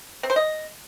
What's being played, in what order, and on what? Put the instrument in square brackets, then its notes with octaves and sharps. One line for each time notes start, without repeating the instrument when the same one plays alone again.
[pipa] C4
C5
D#5